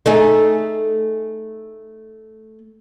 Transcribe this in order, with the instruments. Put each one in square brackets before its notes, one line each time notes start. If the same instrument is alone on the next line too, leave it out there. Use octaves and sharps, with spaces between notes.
[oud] A3 D#4 G#4